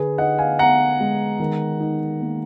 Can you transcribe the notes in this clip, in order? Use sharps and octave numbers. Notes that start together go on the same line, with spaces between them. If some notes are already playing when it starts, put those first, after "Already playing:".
Already playing: D3 G#4 B4
D#4 D#5 F#5
F5 G#5
B3 F#5 A#5
G#3
D#3
D#4
A#3